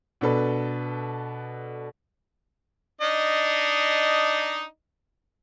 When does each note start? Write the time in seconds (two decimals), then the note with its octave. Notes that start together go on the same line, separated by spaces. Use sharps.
0.21 B2 D4 A4 B4
3.01 D4 D#4 D#5